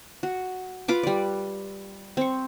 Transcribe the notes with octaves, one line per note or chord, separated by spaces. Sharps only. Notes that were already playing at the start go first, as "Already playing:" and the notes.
F#4
F4 B4 D6
G3 D5
C4 C#6